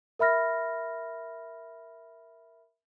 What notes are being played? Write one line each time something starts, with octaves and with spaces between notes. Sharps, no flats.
A#4 E5 B5 F6 A#6